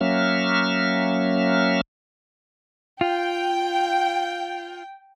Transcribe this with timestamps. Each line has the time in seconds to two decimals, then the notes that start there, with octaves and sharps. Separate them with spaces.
0.01 F#3 A#3 C#4 E5 F6
3.01 F4 G5